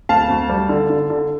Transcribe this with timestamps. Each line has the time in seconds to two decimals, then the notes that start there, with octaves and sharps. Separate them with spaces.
0.09 D2 F5 A5
0.30 D2
0.50 G3
0.69 D3
0.90 D3
1.10 D3